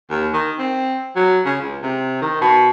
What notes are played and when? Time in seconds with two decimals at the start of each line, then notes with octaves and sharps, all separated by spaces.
0.10 D#2
0.33 D#3
0.58 C4
1.16 F#3
1.45 C#3
1.61 C#2
1.82 C3
2.21 D#3
2.41 B2